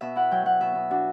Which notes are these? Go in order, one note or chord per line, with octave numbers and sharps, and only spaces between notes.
B2 E5
E4 F#5
F#3 G5
F#3 F#5
B2 E5
B2
D4 F#4